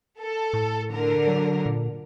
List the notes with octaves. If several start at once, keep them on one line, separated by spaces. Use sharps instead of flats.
A4
A2
D3 A#4
F#3
A#2